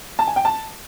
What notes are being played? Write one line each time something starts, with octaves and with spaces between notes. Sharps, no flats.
A5
G#5
G5
A5